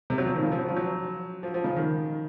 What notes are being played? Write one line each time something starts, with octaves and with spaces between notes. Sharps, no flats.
C3
F#3
F3
D#3
C#3
F3
F#3
F3
F#3
F3
F3
C#3
D#3